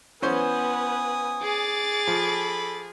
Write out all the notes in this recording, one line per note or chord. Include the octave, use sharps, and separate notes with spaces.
E3 B3 C#4 B4 C5 G#5 D#6
G#4 D6 A6
F3 A4 B5